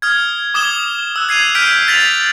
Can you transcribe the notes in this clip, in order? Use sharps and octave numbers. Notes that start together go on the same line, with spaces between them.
D#6 F6 G#6
D6 D#6 G#6 E7 G7
E6 F#6
G#6 C7 D#7 F7
F6 G6 B6 C7 D7 D#7
A6 B6 F7 F#7